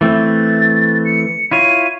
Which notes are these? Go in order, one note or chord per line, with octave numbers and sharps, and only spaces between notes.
E3 A3 C4 A6
C#7
E4 F4 C#5 D#7